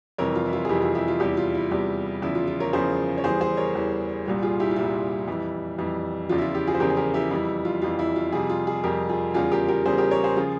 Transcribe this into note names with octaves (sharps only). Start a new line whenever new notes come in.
F2 C3 E3 G3 A#4 C#5
F4
E4
F4
G#4
F2 C3 E3 G3 E4 G4
F4 G#4
E4 G4
F4
E2 C3 G3 E4 G4
F4
E4
E2 C3 G3
E2 C#3 F3 E4
F4
F4
A#4 C#5
E2 C#3 F3 G#4 C5
C#5
E2 E3 G3 G#4 C5
G#4 C5
A#4 C#5
E2 E3 G3
C2 A#2 G3
F4 G#4
E4 G4
F4
C2 A#2 G3 E4
F2 E3 G3
F2 E3 G3
E2 C#3 F3 F4
E4
F4
E4 G4
F4 G#4
C5
E2 C#3 F3 G4 A#4
G#4
G4 A#4
E4 G4
F2 E3 G3 E4
F4
F2 E3 G3 F4
E4
F4
F2 C3 G3 F4 G#4
F4
F4 G#4
F2 C3 G3 G4 A#4
F4 G#4
E2 C#3 G3 F4 G#4
G4 A#4
G4 A#4
E2 C#3 G3 G#4 C5
G4 A#4
A#4 C#5
G#4 C5
C#3 F3 F4 G#4